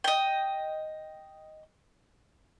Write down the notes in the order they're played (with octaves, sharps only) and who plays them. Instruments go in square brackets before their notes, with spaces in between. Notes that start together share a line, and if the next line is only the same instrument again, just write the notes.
[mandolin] D#5 G5